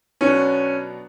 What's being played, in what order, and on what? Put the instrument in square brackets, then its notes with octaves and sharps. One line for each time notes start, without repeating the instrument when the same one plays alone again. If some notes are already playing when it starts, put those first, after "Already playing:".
[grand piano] B2 F#3 B3 D4 F#4 [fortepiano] C#4